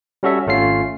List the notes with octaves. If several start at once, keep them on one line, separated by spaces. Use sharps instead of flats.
G3 C#4 F#4 A4 E5
G#1 A3 C#4 F4 C7